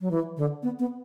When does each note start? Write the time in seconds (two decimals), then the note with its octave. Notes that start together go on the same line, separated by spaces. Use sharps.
0.01 F#3
0.11 E3
0.37 D3
0.63 B3
0.79 B3